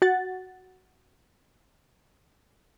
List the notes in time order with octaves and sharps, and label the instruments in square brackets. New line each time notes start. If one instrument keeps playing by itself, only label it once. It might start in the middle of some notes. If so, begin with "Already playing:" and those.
[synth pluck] F#4 F#5 A6